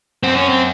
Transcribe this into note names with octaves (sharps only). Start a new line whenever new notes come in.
F#2 C4
C#4
C4